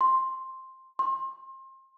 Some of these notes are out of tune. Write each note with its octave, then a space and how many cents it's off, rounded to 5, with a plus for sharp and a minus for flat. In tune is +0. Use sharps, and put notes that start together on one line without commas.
C6 +5
C6 +30